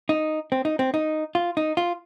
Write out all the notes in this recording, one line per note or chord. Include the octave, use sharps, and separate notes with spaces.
D#4
C4
D#4
C4
D#4
F4
D#4
F4